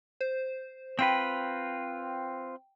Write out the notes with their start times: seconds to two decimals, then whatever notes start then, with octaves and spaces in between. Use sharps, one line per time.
0.21 C5
0.99 C4 F4 B4 G5